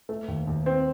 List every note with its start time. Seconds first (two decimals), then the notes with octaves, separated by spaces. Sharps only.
0.09 A3
0.28 D#2
0.47 D#2
0.66 C4